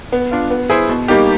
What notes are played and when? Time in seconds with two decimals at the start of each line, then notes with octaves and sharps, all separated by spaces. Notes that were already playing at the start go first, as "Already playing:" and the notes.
0.12 B3
0.31 D4 F4
0.51 B3
0.69 E4 G#4 C5
0.89 B2
1.08 G3 A#3 D#4 G4